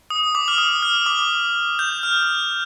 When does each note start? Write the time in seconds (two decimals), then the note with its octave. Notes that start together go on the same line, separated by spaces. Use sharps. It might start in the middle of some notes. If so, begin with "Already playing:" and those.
0.10 D#6
0.35 D6
0.48 F6
0.58 D#6
0.83 F6
1.06 D6
1.79 G6
2.03 F6